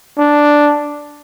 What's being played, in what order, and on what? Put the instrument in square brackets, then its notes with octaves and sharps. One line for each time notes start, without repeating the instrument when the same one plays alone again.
[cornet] D4